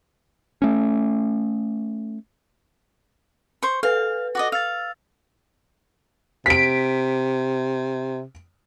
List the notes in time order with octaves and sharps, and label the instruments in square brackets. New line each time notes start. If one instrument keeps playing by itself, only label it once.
[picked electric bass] A3 C#4
[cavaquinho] C5 C#6
[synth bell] A4 B4 [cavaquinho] F5
[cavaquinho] F#4 D5 D#5
[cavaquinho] F5 [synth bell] E6 A6
[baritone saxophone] C3 [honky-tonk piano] B6 D7